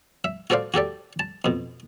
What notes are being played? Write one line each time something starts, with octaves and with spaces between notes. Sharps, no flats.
E5
F#4 A4 C5 D5 F5
F#4 G4 A4 D5
A5
F2 B2